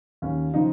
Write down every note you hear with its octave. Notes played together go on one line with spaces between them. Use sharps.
D#2 C#4
C#3 F3 D#4